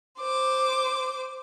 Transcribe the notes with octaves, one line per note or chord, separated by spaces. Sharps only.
C5 D6